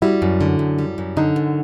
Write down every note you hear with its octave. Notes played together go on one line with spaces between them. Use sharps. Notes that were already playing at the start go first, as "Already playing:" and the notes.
G3 E4 F#4
F#2
D3
F#2
G3
F#2
D3 D#4
F#2